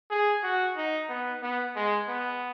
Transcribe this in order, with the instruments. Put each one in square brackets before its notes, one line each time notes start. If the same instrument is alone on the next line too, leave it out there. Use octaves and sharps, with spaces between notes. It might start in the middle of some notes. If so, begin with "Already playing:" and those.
[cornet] G#4
F#4
D#4
B3
B3
G#3
B3